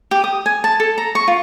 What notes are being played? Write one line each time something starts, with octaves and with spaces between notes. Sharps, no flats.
G4
D#6
G#5
A5
A4
A#5
C#6
F4